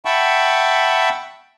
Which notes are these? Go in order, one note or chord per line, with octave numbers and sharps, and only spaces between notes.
E5 F#5 G5 A5 B5 C#6